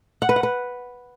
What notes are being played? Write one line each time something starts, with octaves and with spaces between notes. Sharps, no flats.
F#5
B4
F#5
B4